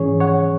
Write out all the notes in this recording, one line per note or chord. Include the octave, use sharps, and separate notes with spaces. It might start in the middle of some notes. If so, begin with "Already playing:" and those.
Already playing: G#2 E3 C#4 G#4 C#5
C#5 F#5